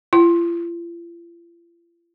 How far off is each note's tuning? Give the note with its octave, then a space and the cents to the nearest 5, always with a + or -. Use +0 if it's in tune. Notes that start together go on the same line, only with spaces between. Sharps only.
F4 -45